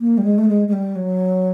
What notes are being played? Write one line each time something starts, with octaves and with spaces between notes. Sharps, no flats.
A#3
G3
G#3
A3
G#3
G#3
G3
F#3